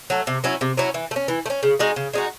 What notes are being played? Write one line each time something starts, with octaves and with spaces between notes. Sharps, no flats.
F#3 A3
C3
F#3 C#4 E4
C3
F#3 C#4 E4
E3
A3
C#4
E3
A3
C#4
C#3
G#3 D#4 F#4
C#3
G#3 D#4 F#4